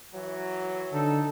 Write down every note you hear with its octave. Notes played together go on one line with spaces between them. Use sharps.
E3 F#3
D3 D#4 A4